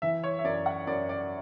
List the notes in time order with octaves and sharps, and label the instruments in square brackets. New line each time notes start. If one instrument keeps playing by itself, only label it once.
[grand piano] E3 E5
C#5
E5
F#2 D5
F#5
F#2 D5
D5